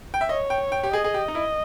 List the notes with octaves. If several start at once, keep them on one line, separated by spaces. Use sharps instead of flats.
G5
E5
C#5 D#5
G5
G5
G4
G#4 D#5
G#4
G4
D#4
E4